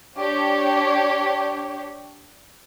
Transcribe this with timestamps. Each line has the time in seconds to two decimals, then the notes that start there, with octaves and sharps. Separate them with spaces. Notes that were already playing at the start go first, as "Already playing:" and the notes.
0.17 D4 G4 C#5